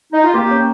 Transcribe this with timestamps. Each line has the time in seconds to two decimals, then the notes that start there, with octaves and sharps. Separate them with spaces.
0.13 D#4
0.24 F4
0.34 A#3 G4
0.51 C#4